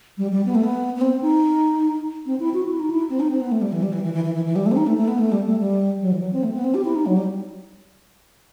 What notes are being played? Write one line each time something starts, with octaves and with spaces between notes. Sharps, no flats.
G3
G3
B3
A3
B3
B3
C4
D#4
C4
E4
F#4
E4
D#4
E4
C4
D#4
C4
B3
A3
G3
E3
G3
E3
E3
E3
E3
E3
E3
G3
A3
C4
D#4
A3
A3
B3
A3
G3
A3
G3
F#3
E3
F#3
C4
A3
B3
C4
G4
E4
D#4
F#3
G3